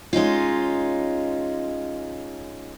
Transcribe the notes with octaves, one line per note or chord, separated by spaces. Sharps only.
G#3 C#4 D#4 F4